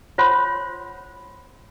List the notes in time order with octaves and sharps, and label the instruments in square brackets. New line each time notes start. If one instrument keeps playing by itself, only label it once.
[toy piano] F4 C5 C#5 F#5 B5 C6